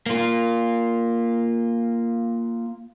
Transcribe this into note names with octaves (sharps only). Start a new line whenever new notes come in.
A#3 F4